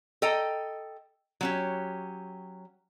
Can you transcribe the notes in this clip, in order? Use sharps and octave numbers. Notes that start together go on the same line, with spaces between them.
A4 D#5 G5 A#5
F#3 C#4 G4